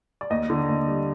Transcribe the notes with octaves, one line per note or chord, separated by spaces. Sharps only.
D5
D#2 D#5
D3
D#2
G3